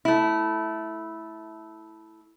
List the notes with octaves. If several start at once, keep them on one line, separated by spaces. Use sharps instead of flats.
A3 E4